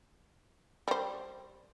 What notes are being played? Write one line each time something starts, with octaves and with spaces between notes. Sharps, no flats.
G3 C5